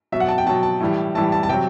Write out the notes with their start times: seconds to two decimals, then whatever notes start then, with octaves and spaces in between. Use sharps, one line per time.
0.12 B2 F#3 E5
0.20 F#5
0.28 A5
0.38 G5
0.46 B2 F#3 A5
0.63 A5
0.80 A2 E3 G3
1.15 A2 E3 G3 A5
1.32 A5
1.43 A5
1.49 C3 F#3 G5